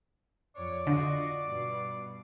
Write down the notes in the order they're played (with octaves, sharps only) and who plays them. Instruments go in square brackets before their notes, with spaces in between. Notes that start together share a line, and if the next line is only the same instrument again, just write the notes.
[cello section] F2 C#5 [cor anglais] D5
[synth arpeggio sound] D3 [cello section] F4 F#4 D#5
[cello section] G2 B2